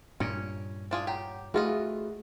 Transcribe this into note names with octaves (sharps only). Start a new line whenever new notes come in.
G2 A#2 C#4
D4 F4 G#4
G4 C#5 F#5 G5 A#5
E3 A3 F4 F#4 G#4 D#5 E5 G5